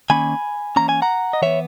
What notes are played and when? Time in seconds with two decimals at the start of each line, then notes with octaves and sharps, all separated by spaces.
0.10 D#3 A#3 C#4 G#5 B5
0.76 E3 A#3 C#4 A#5
0.89 G#5
1.02 F#5 A#5
1.33 D#5
1.42 E3 B3 C#5 E5